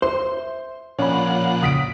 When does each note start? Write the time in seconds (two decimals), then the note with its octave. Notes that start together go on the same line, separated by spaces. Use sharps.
0.02 C5 E5 C6
0.99 A#2 F3 C#4 C#5 D5 F#5 B5
1.63 C#3 D#6 B6 D7